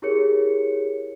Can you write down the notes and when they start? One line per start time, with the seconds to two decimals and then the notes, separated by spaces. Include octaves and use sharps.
0.02 E4 G4 G#4 A#4 C#5 C#7